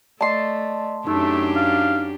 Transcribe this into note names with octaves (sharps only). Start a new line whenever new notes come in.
A3 D5 D#5 A5 C6
F#2 A3 D4 D#4 G4
F5